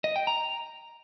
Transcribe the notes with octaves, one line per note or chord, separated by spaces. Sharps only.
D#5
G5
A#5